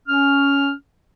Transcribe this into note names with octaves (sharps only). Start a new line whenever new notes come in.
C#4 F6